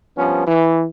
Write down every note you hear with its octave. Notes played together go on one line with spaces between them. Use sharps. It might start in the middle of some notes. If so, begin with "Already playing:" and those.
G2 F3 B3 C#4
E3